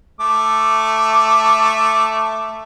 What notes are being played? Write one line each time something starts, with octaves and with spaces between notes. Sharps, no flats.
A3 D6